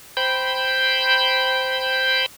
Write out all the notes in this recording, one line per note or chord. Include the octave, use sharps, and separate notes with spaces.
C5 G5 B5 G6